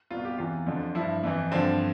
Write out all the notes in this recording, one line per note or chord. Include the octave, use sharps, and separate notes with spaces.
C2 B2 F4
G4
E2 C3 E3 F4
F2 D3 F3
G2 F3 E4
F2 E3
G2 D3 F3 C4